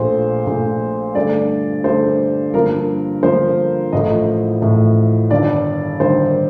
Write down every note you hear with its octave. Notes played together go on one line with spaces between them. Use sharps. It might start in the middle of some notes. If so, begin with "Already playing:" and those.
Already playing: A#1 A#2 A3 C5
A#1 A#2 A3
G2 D3 A3 D5
G2 D3 A3 C5
G2 D3 F3 A#3 A#4
G2 D3 F3 A#3 C5
A1 A2 F3 A3 D#5
A1 A2 F3 A3
G1 G2 D#3 D5
G1 G2 D#3 C5